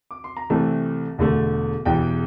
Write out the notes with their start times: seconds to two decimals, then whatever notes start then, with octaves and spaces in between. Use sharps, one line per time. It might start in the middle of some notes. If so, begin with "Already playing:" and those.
0.11 D6
0.24 C6
0.37 A#5
0.50 C2 C3 E3 A3 C4 A5
1.18 E1 E2 D3 A3
1.85 E1 E2 E3 G3 G5